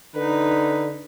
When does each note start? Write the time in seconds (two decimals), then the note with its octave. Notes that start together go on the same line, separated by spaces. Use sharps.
0.15 D3 D#4 B4